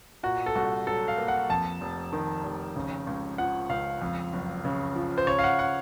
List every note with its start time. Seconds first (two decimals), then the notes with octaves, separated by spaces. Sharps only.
0.23 A#2 F#4
0.46 A4
0.55 C2 F#4
0.87 F#3 A4
1.08 F5
1.18 A#3
1.28 F#5
1.50 F2 A5
1.81 F1
2.13 D#3
2.44 F1
2.76 C#3
3.07 C#2
3.38 F3 F#5
3.69 C#2 F5
4.02 F2
4.33 F#1
4.65 C#3
4.96 F3
5.18 C5
5.27 C#3 C#5
5.39 F5
5.44 F#5
5.59 F#5